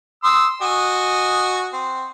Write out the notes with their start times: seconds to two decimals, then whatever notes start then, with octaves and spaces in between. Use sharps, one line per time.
0.24 C6 D#6 E6
0.62 F#4 D#5 G#5
1.73 C4